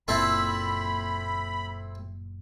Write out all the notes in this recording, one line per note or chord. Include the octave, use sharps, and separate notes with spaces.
F#1 A#2 C4 E4 A4 B5